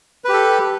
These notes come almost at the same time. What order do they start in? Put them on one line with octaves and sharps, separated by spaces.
B4 G4 A4